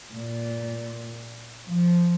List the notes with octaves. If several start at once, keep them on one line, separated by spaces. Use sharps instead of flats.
A#2
F3